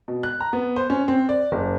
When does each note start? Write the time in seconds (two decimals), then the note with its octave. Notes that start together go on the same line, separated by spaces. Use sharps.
0.08 B2
0.23 F#6
0.40 A#5
0.53 B3
0.76 C5
0.90 C#4
1.08 C4
1.29 D5
1.52 F#1